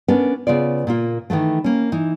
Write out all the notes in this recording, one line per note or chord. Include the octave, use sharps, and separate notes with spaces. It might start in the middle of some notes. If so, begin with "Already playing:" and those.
B3 C#4 D4 A#4
C#3 B3 F4 D5
A#2 A#3 F4
D#3 E3 F#3 A3
A#3 C#4
E3 D#4